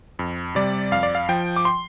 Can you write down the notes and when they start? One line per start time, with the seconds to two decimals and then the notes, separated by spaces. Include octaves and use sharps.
0.19 F2
0.55 C3 G3 D5
0.92 F2 F5
1.03 D5
1.15 F5
1.29 F3 G5
1.56 D6
1.65 C6